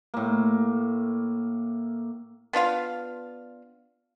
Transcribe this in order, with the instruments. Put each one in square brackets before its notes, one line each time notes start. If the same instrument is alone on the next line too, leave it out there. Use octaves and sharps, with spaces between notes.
[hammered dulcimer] A2 A#3
[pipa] B3 D4 F4 F5